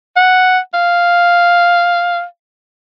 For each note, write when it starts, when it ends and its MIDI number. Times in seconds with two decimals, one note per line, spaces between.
0.17 0.59 78
0.74 2.24 77